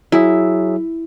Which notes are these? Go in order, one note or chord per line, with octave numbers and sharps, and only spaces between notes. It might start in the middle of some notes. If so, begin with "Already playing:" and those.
F#3 E4 G#4 E5